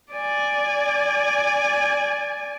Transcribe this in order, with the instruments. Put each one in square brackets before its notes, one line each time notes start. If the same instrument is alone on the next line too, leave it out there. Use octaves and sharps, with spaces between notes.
[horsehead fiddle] D5 G#5